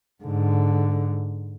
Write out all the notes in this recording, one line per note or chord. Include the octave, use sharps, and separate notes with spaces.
G#2 D3